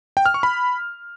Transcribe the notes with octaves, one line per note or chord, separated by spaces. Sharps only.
G5
F6
C#6
B5